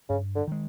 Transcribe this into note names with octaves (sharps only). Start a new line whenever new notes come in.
G2 C#3
D3
D#3 G#3